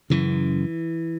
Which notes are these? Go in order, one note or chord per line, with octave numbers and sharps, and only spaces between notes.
F#2 C#3 E3